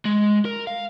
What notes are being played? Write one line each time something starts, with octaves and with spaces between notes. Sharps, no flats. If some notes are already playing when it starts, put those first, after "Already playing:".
G#3
A#4
F5